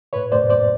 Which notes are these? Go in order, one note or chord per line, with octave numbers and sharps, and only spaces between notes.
A2 B4 C#5
A2 C5 D5
A2 C5 D5